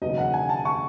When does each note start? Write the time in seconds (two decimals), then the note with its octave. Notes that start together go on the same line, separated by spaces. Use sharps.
0.02 E1 D#2 C#3 F#3 B3 D#5
0.18 F#5
0.34 G#5
0.49 A5
0.65 C#6